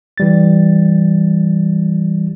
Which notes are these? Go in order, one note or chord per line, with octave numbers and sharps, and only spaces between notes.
E3 G3 A6